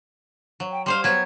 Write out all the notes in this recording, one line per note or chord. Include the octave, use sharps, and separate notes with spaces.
F#3
G5
G3 C5 F5 C6
F#3 B3 G#6